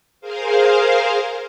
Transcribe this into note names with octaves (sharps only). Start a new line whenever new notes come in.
G#4 A#4 C5 F5